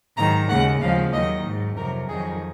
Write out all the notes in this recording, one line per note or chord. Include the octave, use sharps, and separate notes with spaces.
G#2 D#3 F#3 A#5
D#2 C#3 G#3 F#5
D#2 C#3 F3 G#3 F5
D#2 D#3 F#3 D#5
G#2 F#3
F2 C3 F#3 A#4
F2 D#3 F#3 G#4